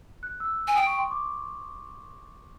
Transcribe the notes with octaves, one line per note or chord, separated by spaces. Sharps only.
F#6
E6
G#5
G5 D#6
C#6
C6
D6